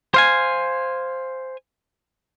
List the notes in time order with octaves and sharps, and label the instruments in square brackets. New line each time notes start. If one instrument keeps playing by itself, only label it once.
[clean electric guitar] C5 F5 G#5